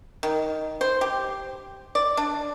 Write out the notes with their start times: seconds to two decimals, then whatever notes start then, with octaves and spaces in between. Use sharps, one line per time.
0.23 D#3
0.81 C5
1.01 G4
1.95 D5
2.17 D4